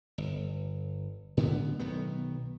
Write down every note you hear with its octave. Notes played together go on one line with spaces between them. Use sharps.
G1
A2 D3 B3
B1 D#3 B3